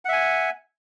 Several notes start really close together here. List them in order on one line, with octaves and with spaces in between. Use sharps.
F#5 E5 G#5